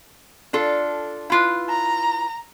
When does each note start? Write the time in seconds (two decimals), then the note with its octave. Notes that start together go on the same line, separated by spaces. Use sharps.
0.53 D4 F4 A4
1.30 E4 F4 B4
1.69 A#5